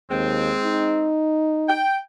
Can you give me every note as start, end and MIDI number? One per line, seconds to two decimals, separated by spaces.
0.10 0.52 39
0.10 1.13 56
0.10 1.13 60
0.63 1.83 63
1.69 1.98 79